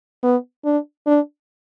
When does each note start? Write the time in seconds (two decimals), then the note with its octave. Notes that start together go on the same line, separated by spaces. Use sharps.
0.23 B3
0.65 D4
1.07 D4